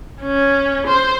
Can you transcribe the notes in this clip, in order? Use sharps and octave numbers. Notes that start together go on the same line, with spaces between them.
C#4
C5